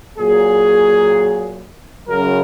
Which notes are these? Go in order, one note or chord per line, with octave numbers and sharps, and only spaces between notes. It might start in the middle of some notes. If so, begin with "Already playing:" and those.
A#2 F#3 G#4
F#2 C#3 F#3 A#4